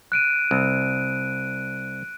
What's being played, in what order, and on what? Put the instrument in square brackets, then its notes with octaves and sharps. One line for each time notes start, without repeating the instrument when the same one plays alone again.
[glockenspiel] F#6 D7 D#7
[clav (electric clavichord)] C2